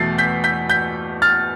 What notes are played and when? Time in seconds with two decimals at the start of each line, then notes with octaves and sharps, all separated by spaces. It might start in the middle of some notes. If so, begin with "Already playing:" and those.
Already playing: E2 B2 A3 A6 C7
0.18 G6 B6
0.44 G6 B6
0.69 G6 B6
1.22 F6 A6